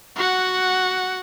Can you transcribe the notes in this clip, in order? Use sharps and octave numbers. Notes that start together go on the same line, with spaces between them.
F#4 F#5